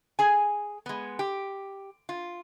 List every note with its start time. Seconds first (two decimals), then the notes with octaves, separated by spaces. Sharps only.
0.19 G#4 G#5
0.86 G#3 B3
1.19 G4
2.09 F4